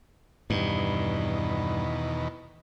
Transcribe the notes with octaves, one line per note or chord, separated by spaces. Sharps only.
E2 G2 B2 D#3